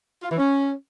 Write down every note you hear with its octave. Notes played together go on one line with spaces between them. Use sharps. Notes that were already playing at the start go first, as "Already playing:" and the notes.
F4
E3
C#4